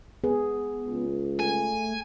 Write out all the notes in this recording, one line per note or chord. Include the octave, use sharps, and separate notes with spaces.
B3 G#4
C#2
A3 G#5